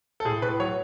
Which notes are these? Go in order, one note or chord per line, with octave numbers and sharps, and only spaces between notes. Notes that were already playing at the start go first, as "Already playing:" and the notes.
A4
A2 G#4
A2 B4
F#3 C#5